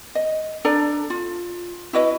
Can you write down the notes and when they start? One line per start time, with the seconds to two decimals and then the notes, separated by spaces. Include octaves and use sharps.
0.15 D#5
0.65 D4 A4 D5 A#5
1.10 F4
1.93 E4 F#4 B4 D#5